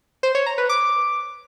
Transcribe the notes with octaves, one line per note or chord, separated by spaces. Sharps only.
C5
C#5
A#5
B4
D6